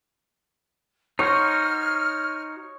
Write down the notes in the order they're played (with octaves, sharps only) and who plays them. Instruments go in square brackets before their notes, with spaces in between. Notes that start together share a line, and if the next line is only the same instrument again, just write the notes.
[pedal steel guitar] D#4 F#4 C5 [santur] C#5 [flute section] F6